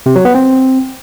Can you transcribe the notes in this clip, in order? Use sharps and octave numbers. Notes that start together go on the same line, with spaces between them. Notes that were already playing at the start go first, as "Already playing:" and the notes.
C3
F#3
B3
C4